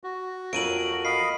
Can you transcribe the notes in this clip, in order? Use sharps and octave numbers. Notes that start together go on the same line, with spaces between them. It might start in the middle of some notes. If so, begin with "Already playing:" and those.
F#4
F2 F#3 A#4 D7 D#7 F#7
D#5 F5 B5 C7